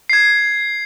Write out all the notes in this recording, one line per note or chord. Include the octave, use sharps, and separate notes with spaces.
G#6 C7